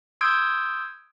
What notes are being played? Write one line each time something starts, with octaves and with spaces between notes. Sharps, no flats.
C6 D#6 E6 G6 G#6 D7